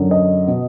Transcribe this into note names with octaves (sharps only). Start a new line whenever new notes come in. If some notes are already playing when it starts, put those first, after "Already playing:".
Already playing: F#2 D3
D#5
B2